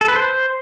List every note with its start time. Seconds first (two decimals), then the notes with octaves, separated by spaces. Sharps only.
0.01 A4
0.08 B4
0.16 C5